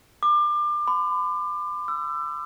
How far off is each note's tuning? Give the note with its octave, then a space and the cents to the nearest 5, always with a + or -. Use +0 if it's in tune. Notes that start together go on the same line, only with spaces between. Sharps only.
D6 +30
B5 +40
E6 +30